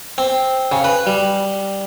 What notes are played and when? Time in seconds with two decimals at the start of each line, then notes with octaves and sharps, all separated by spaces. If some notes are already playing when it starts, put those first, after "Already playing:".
0.18 C4
0.72 C#3
0.84 B4
1.06 G3